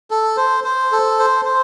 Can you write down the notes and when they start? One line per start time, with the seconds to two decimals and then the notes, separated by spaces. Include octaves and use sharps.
0.11 A4
0.37 C5
0.64 C5
0.92 A4
1.19 C5
1.45 C5